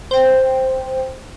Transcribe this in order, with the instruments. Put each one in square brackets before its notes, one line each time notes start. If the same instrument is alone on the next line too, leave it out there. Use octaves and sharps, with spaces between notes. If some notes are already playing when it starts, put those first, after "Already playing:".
[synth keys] C5 G5